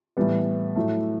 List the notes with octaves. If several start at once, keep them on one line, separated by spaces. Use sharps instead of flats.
A2 E3 G3 B3
A2 F#3 A3